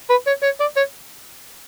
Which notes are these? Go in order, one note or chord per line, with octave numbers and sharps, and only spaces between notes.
B4
C#5
C#5
D5
C#5